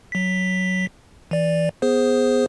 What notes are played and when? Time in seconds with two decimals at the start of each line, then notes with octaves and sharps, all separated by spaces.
0.12 F#3 B6
1.31 E3 D5
1.82 B3 G#4 C5